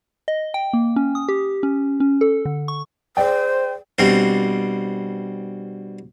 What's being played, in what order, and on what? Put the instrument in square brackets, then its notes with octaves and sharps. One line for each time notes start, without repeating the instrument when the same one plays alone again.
[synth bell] D#5
G5
A#3
C#4
D#6
G4
C#4
C#4
A4
D3
C#6
[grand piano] G#4 D5 G5 [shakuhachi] C5
[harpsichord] G2 B2 G3 C4